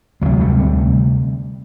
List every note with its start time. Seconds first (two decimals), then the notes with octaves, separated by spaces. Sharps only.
0.21 D2 C3 F#3 G#3
0.40 G3 A3
0.59 D2 C3